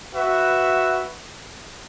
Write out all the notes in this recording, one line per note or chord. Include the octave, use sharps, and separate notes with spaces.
F#4 B4 E5